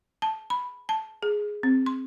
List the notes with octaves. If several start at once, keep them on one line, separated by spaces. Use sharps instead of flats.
A5
B5
A5
G#4
C4
C6